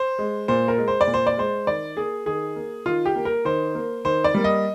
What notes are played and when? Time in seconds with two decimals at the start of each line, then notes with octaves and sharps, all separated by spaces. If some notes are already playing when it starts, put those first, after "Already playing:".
Already playing: C5
0.18 G#3
0.48 A#2 C5
0.68 A#4
0.78 G#3
0.88 C5
1.01 D5
1.07 A#2
1.14 C5
1.27 D5
1.37 G#3 C5
1.67 D#3 D5
1.97 A#3 G#4
2.26 D#3 G#4
2.56 A#3
2.86 D#3 F4
3.06 G4
3.15 A#3
3.25 A#4
3.45 D#3 C5
3.75 A#3
4.05 D#3 C5
4.24 D5
4.35 G3 A#3
4.44 D#5